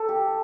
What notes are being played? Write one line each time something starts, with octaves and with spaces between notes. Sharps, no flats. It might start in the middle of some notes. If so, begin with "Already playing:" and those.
Already playing: A4
G4